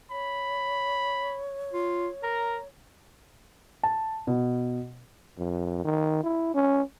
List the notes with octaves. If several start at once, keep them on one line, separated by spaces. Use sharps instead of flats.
C#5 B5
F4
A#4 A#5
A5
B2
F2
D#3
E4
C#4